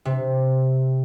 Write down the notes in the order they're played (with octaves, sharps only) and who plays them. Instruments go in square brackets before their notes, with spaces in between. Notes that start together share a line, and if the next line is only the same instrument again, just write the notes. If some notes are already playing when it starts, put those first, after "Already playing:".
[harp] C3